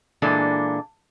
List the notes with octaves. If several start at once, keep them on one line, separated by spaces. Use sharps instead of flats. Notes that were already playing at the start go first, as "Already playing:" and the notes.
A#2 E3 G#3 A#3 D4 A4